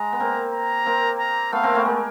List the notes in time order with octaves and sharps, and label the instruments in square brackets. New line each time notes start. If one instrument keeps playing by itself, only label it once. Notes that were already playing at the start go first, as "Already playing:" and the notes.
Already playing: [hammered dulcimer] G#3 [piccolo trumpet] A#5
[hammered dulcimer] B3
A#3 C4
[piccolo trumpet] A#5
[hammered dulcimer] A#3 C4
[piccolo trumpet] A#5
[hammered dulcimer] A3 B3 [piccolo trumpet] F5
[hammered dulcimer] A#3 C4
A3 B3
G#3 A#3